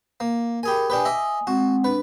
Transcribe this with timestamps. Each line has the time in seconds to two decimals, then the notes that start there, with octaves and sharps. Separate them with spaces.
0.20 A#3
0.63 G4 G#4 A#4 G#5 B5
0.90 D4 G4 B4 G#5 D#6
1.05 D#5 E5 D6
1.47 G#3 C4 F#4 F#5
1.84 D4 B4